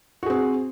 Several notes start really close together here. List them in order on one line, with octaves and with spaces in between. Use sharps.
F#4 G#4 C4